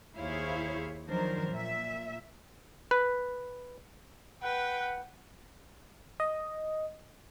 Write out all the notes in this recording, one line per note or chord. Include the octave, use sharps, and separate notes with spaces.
D#2 E4 G#4 C5 C#5 F5
D#3 F3 F#3 D4 A#4 C5
A#2 E5
B4
B4 F#5 G5
D#5